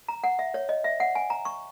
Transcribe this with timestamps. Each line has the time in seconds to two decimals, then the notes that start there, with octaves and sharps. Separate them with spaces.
0.08 A#5
0.24 F#5
0.39 E5
0.54 C#5
0.69 D#5
0.84 E5
1.00 F#5
1.15 G#5
1.30 A#5
1.45 C#6